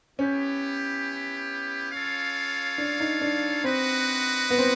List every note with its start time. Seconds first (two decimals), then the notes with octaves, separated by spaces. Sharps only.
0.19 B3 C#4 E4 G4
1.92 F4 A4 C#5 F5
2.78 D4
3.00 D#4
3.21 D4
3.64 C4 F#4 B4 D#5 F#5
4.50 B3
4.59 C4